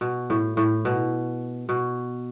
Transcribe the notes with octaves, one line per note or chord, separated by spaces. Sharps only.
B2
A2
A2
B2
B2